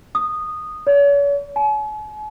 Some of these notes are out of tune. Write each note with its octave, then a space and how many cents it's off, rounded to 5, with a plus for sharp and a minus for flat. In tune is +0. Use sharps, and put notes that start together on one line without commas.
D#6 -10
C#5 +40
G#5 +45